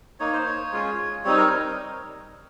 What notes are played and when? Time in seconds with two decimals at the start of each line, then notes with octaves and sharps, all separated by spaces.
0.20 A#3 D#4 C#5
0.33 C5
0.45 C#5
0.72 G#3 C#4 F4
1.24 G3 C4 D#4 C#5
1.37 A#4